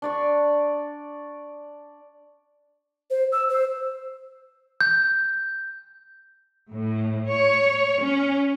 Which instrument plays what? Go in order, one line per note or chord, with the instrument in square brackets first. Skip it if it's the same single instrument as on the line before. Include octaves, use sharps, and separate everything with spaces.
[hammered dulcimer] D4 D5 C#6
[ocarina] C5
E6
C5
[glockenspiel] G6
[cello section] A2
C#5
C#4